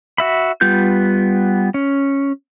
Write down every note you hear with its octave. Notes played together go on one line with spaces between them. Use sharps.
F#4 E5 B5
G3 B3 F4 G6
C#4